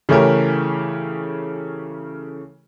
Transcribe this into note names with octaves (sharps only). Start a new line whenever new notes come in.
C#3 E3 A3 C#4 G4 A#4